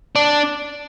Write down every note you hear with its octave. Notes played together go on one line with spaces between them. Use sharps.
D4